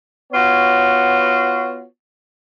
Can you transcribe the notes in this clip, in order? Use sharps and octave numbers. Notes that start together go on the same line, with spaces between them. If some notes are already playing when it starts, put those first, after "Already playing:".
B3 F4 F#4 C#5